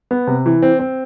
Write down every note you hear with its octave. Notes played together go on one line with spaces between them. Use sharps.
B3
C3
E3
C4
C4